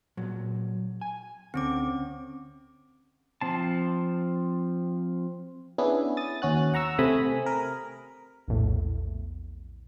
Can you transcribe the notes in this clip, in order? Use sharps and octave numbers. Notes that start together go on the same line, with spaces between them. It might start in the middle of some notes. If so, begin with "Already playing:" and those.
A#2 F#3
G#5
D2 C4 C#4 D6
F3 C4 A5
B3 C#4 D4 E4 G#4
D#6 A6
D#2 C#4 F#4 F#6
F#5 A#5 C#6 E6
C3 A3 C4 G#5 B5 D#6
A#4
A#1 E2 A2